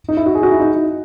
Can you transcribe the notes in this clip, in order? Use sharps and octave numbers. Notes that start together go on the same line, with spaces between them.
D#4
E4
F#4
G#4
F#4
E4
D#4